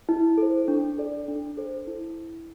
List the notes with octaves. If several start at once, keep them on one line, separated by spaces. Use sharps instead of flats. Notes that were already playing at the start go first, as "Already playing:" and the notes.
E4
A4 C5
D4
A4 D5
D4
A4 C5
E4